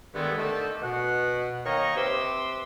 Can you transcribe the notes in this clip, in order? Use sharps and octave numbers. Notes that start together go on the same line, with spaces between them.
G2 D3 D#3 G#3 A3 B3
D3 D#3 A3 C4 G4 A4
B2 F#5
D#3 A#3 C#5 D#5 A#5 C#6
C3 C4 B4 C6 D6 E6